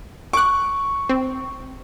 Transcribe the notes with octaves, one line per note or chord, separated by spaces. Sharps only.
C#6 D6 F#6
C4